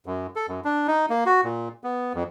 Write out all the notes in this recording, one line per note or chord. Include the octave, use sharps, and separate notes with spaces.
F#2
A4
F#2
D4
D#4
A#3
F#4
A#2
B3
F2